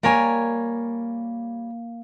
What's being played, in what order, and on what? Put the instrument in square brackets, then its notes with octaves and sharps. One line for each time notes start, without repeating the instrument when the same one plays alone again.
[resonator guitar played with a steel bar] G3 A#4 C#5 [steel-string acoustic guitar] A#3 G#5